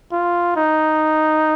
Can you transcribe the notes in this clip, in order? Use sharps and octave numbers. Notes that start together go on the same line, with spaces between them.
F4
D#4